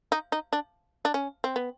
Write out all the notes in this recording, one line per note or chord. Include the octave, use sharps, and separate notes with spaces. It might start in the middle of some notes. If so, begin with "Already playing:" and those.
D#4
D#4
D4
D4
C#4
C4
B3